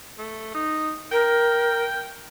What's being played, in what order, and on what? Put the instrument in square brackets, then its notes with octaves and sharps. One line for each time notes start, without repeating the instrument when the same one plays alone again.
[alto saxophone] A3
D#4
[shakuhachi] A#4 [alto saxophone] G5